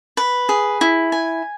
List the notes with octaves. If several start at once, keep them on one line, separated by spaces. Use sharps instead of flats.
B4
G#4
E4
G#5